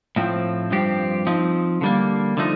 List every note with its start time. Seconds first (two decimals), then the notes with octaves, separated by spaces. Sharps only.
0.16 A2 F3 C4
0.71 G2 F3 C4 G4
1.27 F3 C4 D#4
1.81 D3 G3 A#3
2.37 D3 F3 A3 D#4